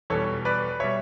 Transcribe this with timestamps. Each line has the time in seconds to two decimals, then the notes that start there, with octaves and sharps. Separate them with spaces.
0.10 E2 B2 G3 A4 C#5
0.45 B4 D5
0.80 B2 G3 C#5 E5